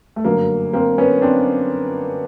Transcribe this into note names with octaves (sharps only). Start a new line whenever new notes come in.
A3
G1 F#2 D3 F#3 A#3
A#3 C4
B3 C#4
C4 D4